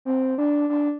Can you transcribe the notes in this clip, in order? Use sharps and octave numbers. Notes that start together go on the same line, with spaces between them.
C4
D4
D4